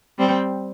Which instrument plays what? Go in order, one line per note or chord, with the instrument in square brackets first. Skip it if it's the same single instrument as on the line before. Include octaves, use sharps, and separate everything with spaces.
[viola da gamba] G3 C4